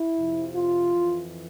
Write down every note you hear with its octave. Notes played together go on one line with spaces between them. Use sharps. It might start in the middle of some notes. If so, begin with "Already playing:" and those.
Already playing: E4
F2 C3 F3
F4
F2 E3